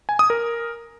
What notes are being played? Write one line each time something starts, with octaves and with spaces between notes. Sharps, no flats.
G#5
D#6
A#4